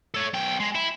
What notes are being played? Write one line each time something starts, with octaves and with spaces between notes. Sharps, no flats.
A4 C#5
B1 G5
G#3
E4